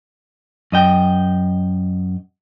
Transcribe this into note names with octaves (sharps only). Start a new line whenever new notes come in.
F#2 D#5 G5